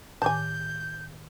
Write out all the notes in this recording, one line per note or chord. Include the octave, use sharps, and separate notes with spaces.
A2 D#3 G#5 A5 D6 G6